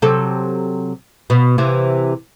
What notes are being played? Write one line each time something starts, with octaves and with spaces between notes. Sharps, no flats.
C3 F#3 A4
B2
C3 E3